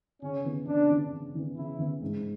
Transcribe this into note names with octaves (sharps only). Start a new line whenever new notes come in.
C#3 C#4
E3 B3
C#3 D4
E3 B3
C#3
E3 B3
C#3 E4
E3 B3
G#2